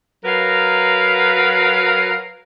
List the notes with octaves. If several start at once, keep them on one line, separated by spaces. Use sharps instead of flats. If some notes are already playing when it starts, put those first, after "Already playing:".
F#3 A#4 B4 F5